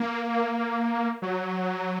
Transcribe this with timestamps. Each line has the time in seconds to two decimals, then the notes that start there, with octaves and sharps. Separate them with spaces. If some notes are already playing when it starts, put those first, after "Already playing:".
Already playing: A#3
1.22 F#3